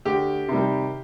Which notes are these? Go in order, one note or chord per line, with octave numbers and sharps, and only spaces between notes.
D2 G4
C3 D#3 G3